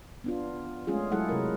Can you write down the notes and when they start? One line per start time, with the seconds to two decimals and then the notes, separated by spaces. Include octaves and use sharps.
0.24 B3 D4 F4
0.87 G#3 A3 C#4 F4 G#4
1.12 F#3 G#3 E4 G#4 A4 F#5
1.29 C3 A#4